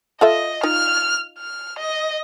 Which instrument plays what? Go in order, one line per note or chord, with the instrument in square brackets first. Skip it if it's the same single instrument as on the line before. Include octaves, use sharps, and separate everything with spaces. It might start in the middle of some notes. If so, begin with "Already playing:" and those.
[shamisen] F4 A4 E5 [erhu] D#5
[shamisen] D#4 F4 [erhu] F6
[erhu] F6
D#5